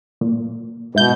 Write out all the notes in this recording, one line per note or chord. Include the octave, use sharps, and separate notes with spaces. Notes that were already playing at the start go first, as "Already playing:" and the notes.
A#2
G#2 B2 E4 G6